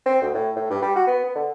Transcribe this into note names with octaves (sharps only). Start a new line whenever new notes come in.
C4
D2
A2
A2
G2
G3
F#4
B3
B3
D3